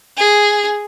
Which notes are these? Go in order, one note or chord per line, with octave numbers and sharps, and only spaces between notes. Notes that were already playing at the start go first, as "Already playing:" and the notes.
G#4